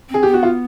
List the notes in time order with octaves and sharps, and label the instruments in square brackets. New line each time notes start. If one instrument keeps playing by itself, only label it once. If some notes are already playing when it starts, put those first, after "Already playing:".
[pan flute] C4
[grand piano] G#4
[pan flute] B3 [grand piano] G4
[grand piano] F#4
F4